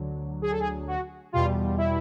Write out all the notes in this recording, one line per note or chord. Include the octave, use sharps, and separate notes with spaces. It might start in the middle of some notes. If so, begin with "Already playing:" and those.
Already playing: D2 D3 F#3
G#4
A4
G#4
F#4
E2 B2 G3 F4
E4